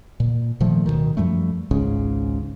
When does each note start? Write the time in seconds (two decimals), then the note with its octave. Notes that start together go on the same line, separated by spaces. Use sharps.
0.20 A#2
0.60 A#2 D#3 F3 A3
0.86 D1 B1 B2 D#3
1.17 F#2 F3 G3 A3
1.71 G#1 C#2 G#2 C#3